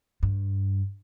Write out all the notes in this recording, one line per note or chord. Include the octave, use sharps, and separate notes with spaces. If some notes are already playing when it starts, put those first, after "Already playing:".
G2